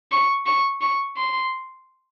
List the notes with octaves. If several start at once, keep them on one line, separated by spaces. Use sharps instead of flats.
C#6
C#6
C#6
C6